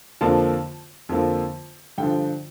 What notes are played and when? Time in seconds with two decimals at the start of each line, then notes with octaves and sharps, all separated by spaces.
0.21 F2 D3 F3 A#3 A5
1.09 F2 D3 F3 A#3
1.98 G2 D3 F3 G5